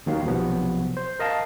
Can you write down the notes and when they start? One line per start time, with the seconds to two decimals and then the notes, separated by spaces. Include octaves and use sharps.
0.06 D#2 D#3 F#3 F5
0.25 B1 C3 F3 F#3 B3
0.97 C5
1.19 A#4 D#5 F5 A5